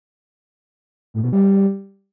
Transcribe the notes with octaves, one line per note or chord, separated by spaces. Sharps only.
A2
B2
G3